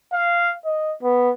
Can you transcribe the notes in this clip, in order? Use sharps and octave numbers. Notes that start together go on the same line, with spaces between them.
F5
D#5
B3